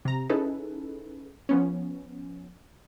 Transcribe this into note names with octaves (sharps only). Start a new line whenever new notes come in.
C3 A#5
C#4 D#4 E4 G#4 A4 B4
F3 B3 C#4